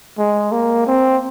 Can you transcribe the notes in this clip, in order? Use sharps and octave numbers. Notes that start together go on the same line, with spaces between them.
G#3
A#3
C4